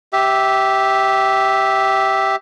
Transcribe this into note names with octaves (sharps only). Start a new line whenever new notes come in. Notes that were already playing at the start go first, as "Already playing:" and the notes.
G4 E5